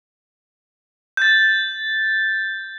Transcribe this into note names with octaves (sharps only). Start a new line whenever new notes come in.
G6 A6